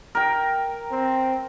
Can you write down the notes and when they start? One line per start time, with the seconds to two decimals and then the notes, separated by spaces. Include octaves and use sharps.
0.15 A#4 G5
0.91 C4